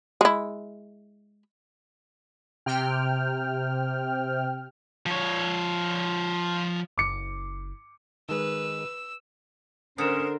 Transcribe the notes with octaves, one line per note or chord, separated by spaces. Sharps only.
G#3 E4
C3 G5 F6
F3 C#5
F#1 D6 C#7
D#3 G#3 B4 E6
D3 C#4 A#4 C5 D#6 C#7 E7